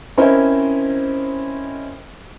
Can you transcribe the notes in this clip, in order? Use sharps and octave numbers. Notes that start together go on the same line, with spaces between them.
C4 C#4 E4 A#4 C5 D#5